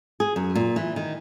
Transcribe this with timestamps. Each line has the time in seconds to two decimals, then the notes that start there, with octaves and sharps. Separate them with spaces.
0.20 G#4
0.36 F#2
0.55 A#2
0.76 E3
0.96 D#3